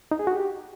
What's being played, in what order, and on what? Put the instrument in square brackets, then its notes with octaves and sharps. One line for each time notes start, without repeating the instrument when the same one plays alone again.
[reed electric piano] D#4
G#4
F#4
G4